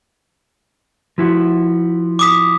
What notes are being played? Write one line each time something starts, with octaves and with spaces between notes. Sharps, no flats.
F3 E4 F#4
D6 D#6 B6